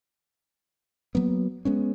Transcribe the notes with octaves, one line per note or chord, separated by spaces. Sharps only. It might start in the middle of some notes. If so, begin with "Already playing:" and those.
F#3 A#3 B3
G#3 B3 C#4